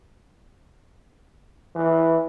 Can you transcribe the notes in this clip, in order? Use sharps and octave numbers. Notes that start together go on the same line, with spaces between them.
E3